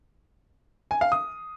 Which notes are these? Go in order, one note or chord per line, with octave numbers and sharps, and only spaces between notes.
G#5
F5
D#6